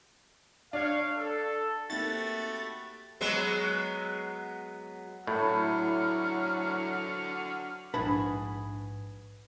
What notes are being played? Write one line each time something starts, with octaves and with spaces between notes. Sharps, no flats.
D4 C#5 F5
A4
A3 A#3 C4 D#4 F#4 G4 B5 A6
F#3 G#3 B3
A2 D3 F#3 E4 C#5 C#6 F6
A#1 G#2 D4 E4 F#4 G#4 B4 A5